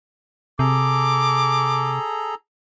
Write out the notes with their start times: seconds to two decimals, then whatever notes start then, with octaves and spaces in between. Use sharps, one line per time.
0.59 C3 G#4 A4 A#5 D6